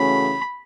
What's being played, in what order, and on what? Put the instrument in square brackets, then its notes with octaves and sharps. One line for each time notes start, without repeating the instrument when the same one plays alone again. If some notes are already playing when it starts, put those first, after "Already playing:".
Already playing: [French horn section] C#3 E3 A3 C#4 F#4 [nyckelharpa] B5